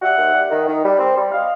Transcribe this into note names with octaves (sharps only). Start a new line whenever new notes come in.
G3 E5 F#5
D#2
G3
D#3
D#3
G3
C4
G3
D#5 F5